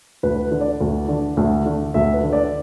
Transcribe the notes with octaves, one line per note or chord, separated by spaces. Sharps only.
D2 B4
D3
D5
D2
D3
D2
D3
D2 E5
B4
D3
D5